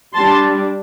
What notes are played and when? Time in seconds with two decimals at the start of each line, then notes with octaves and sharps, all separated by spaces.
0.15 G3 D4 A5 C6